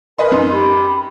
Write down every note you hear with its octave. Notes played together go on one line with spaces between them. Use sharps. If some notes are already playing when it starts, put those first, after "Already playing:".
A#4 B4 D#5 G#5 C6
F#2 D#4 C6
G4 B5